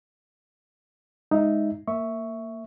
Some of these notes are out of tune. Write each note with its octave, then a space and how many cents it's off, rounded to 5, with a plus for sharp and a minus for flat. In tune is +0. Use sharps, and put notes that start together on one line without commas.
G#3 +0 D#4 +0 E5 +0
A#3 -20 E5 +0 C#6 +5